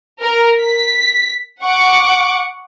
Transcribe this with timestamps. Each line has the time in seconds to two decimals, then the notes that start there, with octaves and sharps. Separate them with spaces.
0.21 A#4
0.62 B6
1.63 F#5 C#6 D6